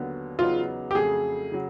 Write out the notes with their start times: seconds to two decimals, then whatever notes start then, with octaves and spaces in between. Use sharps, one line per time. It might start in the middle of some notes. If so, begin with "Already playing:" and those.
Already playing: D#2 D3 F#3 B3
0.39 E2 C#3 F#3 B3 D#4 F4
0.91 G4
0.95 F2 C#3 F#3 A3 G#4
1.52 C#3 F#3